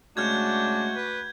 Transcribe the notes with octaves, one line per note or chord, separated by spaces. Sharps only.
C#3 G#3 A3 D4 F#4 F6 G6 G#6
B4